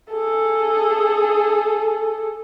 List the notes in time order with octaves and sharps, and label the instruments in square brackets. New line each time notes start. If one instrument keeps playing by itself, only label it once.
[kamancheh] G#4 A4